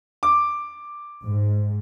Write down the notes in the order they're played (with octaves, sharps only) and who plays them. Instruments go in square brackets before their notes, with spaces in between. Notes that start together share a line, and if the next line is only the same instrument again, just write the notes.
[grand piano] D6
[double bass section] G#2